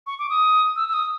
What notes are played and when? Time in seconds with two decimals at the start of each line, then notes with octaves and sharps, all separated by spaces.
0.07 C#6
0.19 D6
0.30 D#6
0.76 E6
0.89 E6
0.93 D#6